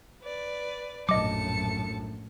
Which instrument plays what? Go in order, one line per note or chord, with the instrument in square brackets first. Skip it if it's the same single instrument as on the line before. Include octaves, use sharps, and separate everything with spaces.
[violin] B4 D5
[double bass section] A#1 F#2 A2 [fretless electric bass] F#3 [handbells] D#5 D6 [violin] A5 C#7